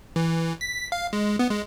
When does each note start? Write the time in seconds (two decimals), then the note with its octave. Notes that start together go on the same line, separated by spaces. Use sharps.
0.16 E3
0.61 B6
0.92 F5
1.13 G#3
1.39 B3
1.51 G#3